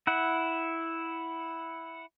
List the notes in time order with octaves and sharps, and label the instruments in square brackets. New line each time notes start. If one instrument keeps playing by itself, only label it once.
[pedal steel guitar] E4 F#5